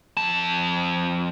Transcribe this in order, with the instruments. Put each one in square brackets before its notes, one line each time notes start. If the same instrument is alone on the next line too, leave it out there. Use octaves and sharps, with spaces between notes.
[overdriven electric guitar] F2 A5